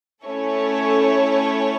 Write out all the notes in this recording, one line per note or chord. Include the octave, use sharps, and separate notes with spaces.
A3 C#4 E4 A4 C#5